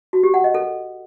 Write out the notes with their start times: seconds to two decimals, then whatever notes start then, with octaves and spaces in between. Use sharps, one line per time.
0.13 F#4
0.23 G4
0.34 F#5
0.44 D#5
0.54 A4